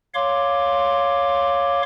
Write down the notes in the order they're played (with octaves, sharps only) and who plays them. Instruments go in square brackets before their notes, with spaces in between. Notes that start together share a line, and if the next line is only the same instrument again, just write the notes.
[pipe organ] C#5 F5 C6 D6